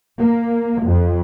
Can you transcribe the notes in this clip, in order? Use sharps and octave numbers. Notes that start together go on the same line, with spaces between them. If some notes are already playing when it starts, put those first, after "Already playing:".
A#3
F2